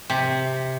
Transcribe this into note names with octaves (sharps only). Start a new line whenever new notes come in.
C3